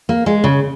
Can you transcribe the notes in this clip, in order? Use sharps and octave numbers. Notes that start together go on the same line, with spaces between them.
A#3
G#3
C#3